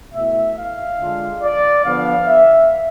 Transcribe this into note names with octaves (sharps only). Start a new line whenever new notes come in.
B2 A3 E4 E5
F5
D3 G#3 D4 F4
D5
D3 F3 B3 F5
E5